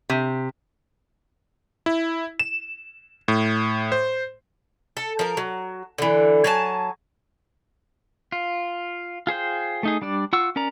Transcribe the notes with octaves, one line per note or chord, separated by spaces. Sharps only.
C3
E4
E7
A2
C5
A4
F3 A#4
F#3
D3 E3
F#3 G#5 A5
F4
F4 G#4 C5 G5
A3 D#4 G#4
G3 D4 D5
F4 F#5 C#6 E6
C#4 A#4 D5 A#5